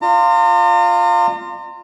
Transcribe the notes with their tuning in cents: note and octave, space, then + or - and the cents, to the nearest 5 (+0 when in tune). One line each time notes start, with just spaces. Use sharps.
F4 +0 D5 +30 A#5 -40